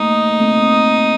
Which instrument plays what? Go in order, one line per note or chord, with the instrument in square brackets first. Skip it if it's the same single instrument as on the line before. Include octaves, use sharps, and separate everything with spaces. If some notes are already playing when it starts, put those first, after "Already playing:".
Already playing: [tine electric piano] A3 A#3 [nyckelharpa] D#4
[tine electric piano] A#3
A3 C4
A3 C4